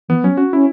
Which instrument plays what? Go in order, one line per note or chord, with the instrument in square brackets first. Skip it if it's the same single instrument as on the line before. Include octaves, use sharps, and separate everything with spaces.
[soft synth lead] E3 [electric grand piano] B3
[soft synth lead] F#3 [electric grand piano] C#4
[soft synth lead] C#4 [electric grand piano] F#4
[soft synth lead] C#4 [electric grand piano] E4